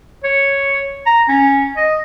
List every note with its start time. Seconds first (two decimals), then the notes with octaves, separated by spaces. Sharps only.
0.24 C#5
1.06 A#5
1.29 C#4
1.77 D#5